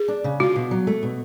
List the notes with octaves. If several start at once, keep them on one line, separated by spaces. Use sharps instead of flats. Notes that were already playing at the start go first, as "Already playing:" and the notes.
Already playing: G#4
D4
C#3
F4 F#4
B2
F#3
A3
B2